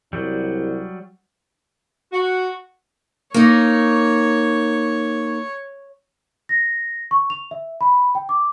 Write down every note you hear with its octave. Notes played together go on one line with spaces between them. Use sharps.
C2 F#3 G3
F#4
A#3 D#4 C#5 C#6
A#6
C#6
F7
E5
B5
G5
D6